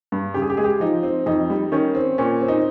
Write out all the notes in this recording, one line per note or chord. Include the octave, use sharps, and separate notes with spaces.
G2
C#3 G4
G#4
G4
G#3 G#4
G4
F3 D#4
C4
F2 D#4
G3
D#3 C#4
C4
A#2 C#4
C4
D#4